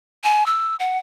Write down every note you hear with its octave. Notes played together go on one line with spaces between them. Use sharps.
G#5
E6
F#5